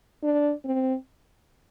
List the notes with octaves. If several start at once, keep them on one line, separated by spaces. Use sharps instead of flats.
D4
C4